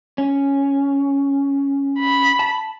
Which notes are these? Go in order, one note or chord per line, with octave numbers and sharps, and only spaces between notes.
C#4
B5
A5